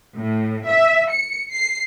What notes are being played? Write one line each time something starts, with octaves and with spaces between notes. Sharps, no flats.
A2
E5
C#7
C7